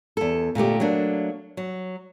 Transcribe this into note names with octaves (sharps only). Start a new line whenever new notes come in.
E2 A4
A#2 D3 A3 G4
F#3 A3 A#3 D4
F#3